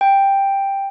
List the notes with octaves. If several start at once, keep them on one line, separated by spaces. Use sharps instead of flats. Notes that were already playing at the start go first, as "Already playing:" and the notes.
G5